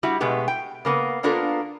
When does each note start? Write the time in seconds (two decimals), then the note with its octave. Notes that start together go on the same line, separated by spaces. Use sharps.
0.03 G3 E4 F#4
0.20 B2 G#3 A3 B3 G4
0.48 G5
0.85 C#3 A#3 B3
1.23 A#3 B3 D4 F4 A4 A#4